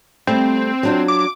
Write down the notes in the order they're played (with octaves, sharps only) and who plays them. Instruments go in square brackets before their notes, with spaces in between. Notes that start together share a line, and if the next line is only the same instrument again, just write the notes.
[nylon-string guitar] G3 A3 [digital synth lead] C4
[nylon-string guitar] F#3 D4 F4
[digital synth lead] D6